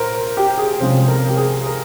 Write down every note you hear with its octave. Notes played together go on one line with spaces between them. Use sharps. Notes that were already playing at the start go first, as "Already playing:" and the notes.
Already playing: A#2 A#4 C5
G4
G#4
C2 C3 F3 G#3 C#4 C5
A#4
G4
G#4
A#4